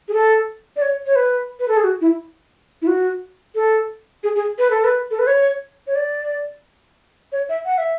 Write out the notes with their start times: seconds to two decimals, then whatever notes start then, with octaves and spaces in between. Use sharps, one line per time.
0.08 G#4
0.14 A4
0.76 D5
0.82 C#5
1.06 C#5
1.16 B4
1.60 B4
1.68 A4
1.77 G#4
1.84 F#4
2.01 E4
2.82 E4
2.87 F#4
3.55 A4
4.24 G#4
4.36 G#4
4.58 B4
4.71 A4
4.84 B4
5.11 A4
5.19 B4
5.27 C#5
5.87 C#5
5.96 D5
7.32 C#5
7.49 E5
7.65 F#5
7.78 E5